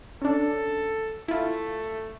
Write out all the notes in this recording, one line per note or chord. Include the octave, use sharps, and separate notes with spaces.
C#4 D4 A4
A3 E4 F4